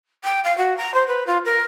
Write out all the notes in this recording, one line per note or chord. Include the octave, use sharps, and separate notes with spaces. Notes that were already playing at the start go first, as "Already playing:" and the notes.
G5
F5
F#4
A#5
C5
B4
F4
A#4